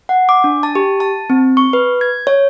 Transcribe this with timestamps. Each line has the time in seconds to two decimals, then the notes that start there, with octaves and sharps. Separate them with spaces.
0.09 F#5
0.29 D6
0.44 D4
0.63 A5
0.75 G4
1.00 A5
1.30 C4
1.57 C#6
1.73 B4
2.01 G#6
2.27 C#5